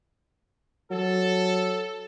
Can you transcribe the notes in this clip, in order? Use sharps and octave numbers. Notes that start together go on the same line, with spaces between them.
F#3 A4